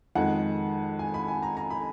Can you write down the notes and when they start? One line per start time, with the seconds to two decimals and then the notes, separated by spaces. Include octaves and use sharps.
0.15 F2 D#3 G#3 F#5
0.99 G#5
1.14 B5
1.28 G#5
1.43 A#5
1.57 A#5
1.70 B5